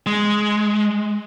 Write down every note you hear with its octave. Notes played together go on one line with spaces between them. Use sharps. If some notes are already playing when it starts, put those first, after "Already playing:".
G#3